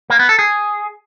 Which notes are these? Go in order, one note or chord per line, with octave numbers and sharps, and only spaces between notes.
A#3
B3
A4
G#4